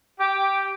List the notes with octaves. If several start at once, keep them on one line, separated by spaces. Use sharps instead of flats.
G4